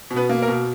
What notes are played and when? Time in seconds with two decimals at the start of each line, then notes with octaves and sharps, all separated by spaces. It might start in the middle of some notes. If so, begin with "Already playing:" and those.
0.11 B2
0.16 B3 B4
0.29 A#3
0.42 A#4
0.48 B2